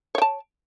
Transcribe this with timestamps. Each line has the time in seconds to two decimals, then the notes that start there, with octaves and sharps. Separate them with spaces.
0.15 C#5
0.18 G5
0.22 A5